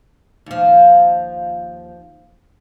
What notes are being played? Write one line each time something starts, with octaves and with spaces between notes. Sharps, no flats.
D#2 F3